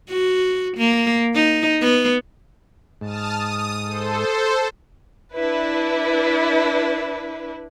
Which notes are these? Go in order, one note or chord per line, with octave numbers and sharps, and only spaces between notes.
F#4
A#3
D#4
B3
G#2 A5 D#6 F6
D#6
A4 C5
D4 E4 B4